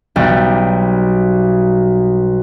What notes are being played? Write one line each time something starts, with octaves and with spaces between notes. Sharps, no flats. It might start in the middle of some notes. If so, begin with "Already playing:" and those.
B1 G3